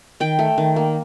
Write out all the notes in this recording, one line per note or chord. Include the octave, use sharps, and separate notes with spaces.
D#3 G5
A3
D#3
A#3